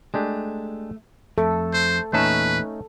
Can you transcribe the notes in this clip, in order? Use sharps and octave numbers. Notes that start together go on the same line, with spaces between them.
G#3 A3 D4 G4
F2 A3 A4
C5
E2 A#2 A3 C#4 D#4 B4 A5